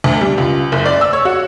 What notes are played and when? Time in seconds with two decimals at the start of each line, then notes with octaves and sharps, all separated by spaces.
0.04 D2
0.21 G3
0.38 C#2
0.72 F#1
0.86 D5
1.01 E6
1.13 C#5
1.25 F#4